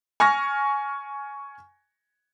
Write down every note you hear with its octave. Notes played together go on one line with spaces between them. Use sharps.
G#5 C#6 F6 A#6